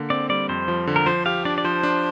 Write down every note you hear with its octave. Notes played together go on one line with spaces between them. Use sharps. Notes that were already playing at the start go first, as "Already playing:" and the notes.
Already playing: D3 A#3
C4 D5
G3 D5
F2 C5
F3
D3
A#4
F3 C5
G4 F5
D4 D5
D5
F3 C5
D4